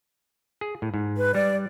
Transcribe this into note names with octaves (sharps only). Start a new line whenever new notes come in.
G#4
A2
G#2
B4
G3 D5